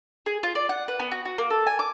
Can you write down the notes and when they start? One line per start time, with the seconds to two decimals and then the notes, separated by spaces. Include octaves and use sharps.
0.26 G#4
0.43 F4
0.55 D5
0.69 F#5
0.88 B4
0.99 B3
1.11 F#4
1.25 F#4
1.38 A#3
1.50 A4
1.67 G#5
1.79 D6